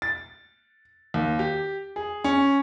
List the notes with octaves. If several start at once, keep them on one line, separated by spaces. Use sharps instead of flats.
A6
D#2
G4
G#4
C#4